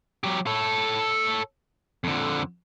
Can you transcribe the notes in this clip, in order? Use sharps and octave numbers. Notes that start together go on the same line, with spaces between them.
F#3 G4
A4 C#5
F2 D3